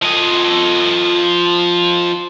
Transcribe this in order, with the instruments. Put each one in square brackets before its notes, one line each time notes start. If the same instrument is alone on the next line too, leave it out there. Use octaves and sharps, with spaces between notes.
[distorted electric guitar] F3 D#5